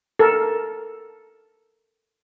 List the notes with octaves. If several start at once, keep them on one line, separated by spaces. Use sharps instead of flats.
A4 A#4